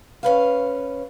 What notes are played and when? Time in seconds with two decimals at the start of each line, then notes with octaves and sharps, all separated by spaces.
0.23 C#4 B4 F5